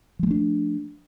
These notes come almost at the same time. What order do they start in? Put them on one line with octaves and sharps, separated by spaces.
F3 G#3 A3 D4